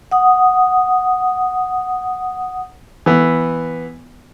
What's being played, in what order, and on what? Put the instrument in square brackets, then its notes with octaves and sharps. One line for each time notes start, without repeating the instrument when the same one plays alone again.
[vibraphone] F#5 D#6
[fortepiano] E3 B3